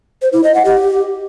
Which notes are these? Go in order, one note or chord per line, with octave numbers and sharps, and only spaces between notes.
C5
E4
D#5
F#5
G4